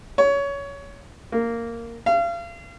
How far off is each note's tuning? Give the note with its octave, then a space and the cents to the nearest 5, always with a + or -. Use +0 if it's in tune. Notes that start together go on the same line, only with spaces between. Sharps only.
C#5 +20
A#3 -10
F5 -35